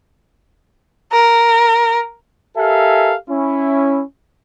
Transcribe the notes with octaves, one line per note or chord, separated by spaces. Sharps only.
A#4
G4 A4 A#4 E5 F5 G#5
C#4 E4